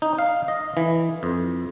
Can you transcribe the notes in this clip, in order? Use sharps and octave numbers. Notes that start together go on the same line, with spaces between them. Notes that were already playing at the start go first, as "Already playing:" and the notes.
D#4
F5
D#5
E3
F2